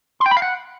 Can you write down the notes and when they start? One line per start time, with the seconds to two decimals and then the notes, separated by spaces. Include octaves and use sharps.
0.20 C6
0.26 G5
0.31 B5
0.37 F5
0.42 F#5